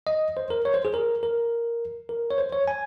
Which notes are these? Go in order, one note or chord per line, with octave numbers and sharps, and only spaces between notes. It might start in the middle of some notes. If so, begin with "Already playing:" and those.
D#5
C5
A#4
C#5
C5
G#4
A#4
A#4
A#4
C#5
C5
C#5
G#5